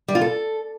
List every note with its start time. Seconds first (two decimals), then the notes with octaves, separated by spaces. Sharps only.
0.08 G3
0.15 F4
0.21 A4